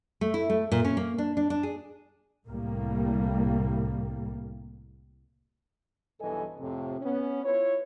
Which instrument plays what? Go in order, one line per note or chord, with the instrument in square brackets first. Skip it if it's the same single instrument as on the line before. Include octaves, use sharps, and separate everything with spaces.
[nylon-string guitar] A3
E4
A3
A#2
C#4
A#3
D4
D4
D4
G#4
[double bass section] C2 A2 G3 A#3
[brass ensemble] B1 G2 E3 A4 D#5 G#5
F2 A2 C3
B3 C#4
E4 F4 B4 C#5